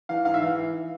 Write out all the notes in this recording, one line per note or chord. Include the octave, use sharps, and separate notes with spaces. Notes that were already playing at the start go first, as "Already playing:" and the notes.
E3 F5
G#2 F5
E5
E3 F5